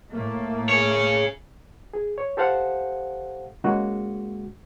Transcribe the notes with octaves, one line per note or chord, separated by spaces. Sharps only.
A2 A3 A#3
G#4 C#5
G#4
C#5
G4 A4 C5 F5 F#5
C#3 G#3 A#3 F#4